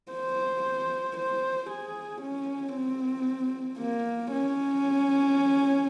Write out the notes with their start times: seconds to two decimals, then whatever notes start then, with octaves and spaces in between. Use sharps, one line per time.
0.12 C5
1.17 C5
1.70 G#4
2.22 C#4
2.74 C4
3.79 A#3
4.32 C#4